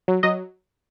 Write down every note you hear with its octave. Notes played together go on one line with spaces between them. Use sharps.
F#3
F#3 D#5